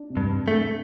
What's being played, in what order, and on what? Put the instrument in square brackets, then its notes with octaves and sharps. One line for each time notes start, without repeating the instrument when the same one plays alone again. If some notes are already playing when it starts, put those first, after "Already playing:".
Already playing: [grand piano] D4
C3
[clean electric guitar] G2
[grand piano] D4
[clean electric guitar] A3
[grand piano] D4